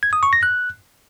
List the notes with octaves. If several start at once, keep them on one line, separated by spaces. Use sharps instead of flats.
G#6
D#6
C#6
A#6
F#6